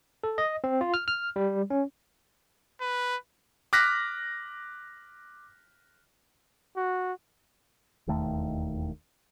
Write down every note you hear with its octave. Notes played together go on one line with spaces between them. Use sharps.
A4
D#5
C4
F4
F6
F6
G3
C#4
B4
D6 F6 F#6 A#6 B6
F#4
E1 D#2 D#3 A3